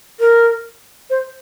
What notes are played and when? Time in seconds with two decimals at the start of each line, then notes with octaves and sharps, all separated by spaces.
0.20 A#4
1.10 C5